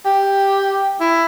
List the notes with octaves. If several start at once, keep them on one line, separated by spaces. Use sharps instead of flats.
G4
E4